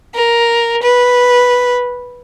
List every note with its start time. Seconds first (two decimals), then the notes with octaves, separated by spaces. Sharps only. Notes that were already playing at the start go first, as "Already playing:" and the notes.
0.14 A#4
0.82 B4